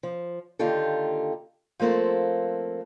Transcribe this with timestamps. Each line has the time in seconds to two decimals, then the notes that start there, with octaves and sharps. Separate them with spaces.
0.03 F3
0.59 D3 D#3 A#3 F4 G4 A4
1.80 F3 A3 A#3 C4 A4